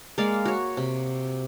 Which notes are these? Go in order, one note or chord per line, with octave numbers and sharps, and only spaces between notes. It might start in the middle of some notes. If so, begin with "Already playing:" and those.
G#3 A#3 D5 F5
F#4 C#5
C3